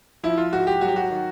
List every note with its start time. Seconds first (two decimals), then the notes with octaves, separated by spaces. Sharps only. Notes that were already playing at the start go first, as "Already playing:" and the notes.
0.23 F3 E4
0.38 F4
0.53 G#2 F#4
0.67 G4
0.81 F#3 F#4
0.88 G4
0.96 F#4
1.11 D#3